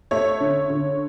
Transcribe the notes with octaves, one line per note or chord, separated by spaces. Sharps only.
A3 C#5
D3
D3